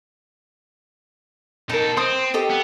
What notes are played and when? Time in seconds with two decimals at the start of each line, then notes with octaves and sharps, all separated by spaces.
1.69 B2 D#4 A4 A#4
1.97 C4 C5 C6 D#6
2.34 G4 A4 D#5
2.50 B3